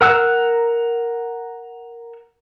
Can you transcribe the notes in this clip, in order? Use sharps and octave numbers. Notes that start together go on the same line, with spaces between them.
A#4 F#5 E6 F#6